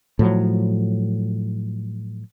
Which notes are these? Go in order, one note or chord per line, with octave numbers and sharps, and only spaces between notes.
A2 F3 F#3